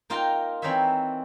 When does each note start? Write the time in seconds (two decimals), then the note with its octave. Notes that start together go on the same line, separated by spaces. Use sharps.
0.10 A#3 D#4 F4 A#4 G5 A#5
0.62 E3 C4 D#4 C5 C#5 E5